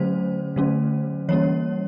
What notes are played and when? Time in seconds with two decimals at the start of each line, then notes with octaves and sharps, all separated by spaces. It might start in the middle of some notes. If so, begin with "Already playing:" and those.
Already playing: D3 F#3 A3 C#4 C5
0.56 D3 F#3 A3 C#4
1.29 E3 G3 A#3 C#4 C#5